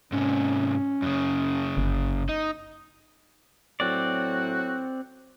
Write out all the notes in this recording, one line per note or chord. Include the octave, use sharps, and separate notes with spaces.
G#2 C3 C#4
F#2 C#3
G1
D#4
A2 F#3 C4 F#4 D5